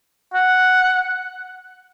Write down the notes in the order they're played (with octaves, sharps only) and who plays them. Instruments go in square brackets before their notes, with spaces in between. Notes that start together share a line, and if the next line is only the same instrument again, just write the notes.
[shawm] F#5